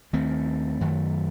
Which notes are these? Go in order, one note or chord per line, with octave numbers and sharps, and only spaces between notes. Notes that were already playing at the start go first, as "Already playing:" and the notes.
D#2 D#3 A3 C4
F#2 D#3 F#3 A3